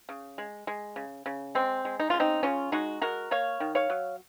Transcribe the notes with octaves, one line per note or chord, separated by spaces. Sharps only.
C#3
G#3
G#3
C#3
C#3
G#3 C4
G#3
D#4
C#3 F4
C4 D#4
C#3 C#4 F4
G#3 D#4 F#4
G#3 F#4 A#4
A#3 C#5 F5
D#3
C#5 F5
F#3